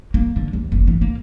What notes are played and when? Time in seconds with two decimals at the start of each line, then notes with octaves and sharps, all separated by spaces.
0.14 A#3
0.36 D3
0.53 D#2
0.72 F#1
0.88 E3
1.01 A#3